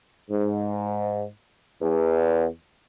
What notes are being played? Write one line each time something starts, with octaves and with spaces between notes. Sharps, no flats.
G#2
E2